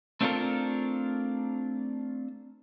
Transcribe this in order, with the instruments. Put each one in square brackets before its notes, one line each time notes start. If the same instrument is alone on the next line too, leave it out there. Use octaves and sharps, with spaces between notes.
[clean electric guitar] A3 C4 D4 F4 A4 A#4